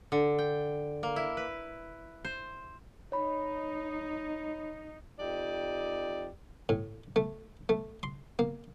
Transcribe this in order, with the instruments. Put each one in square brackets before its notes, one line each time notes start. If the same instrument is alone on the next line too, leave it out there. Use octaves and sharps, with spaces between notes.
[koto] D3
G5
A#3
E4
B4
C5
[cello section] D#4 [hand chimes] C#5 B5
[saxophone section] F2 D#4 G4 D5
[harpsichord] A2
A3
A3
C6
A#3